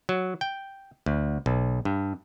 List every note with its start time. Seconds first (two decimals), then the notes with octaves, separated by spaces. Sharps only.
0.09 F#3
0.41 G5
1.06 D2
1.46 B1
1.85 G2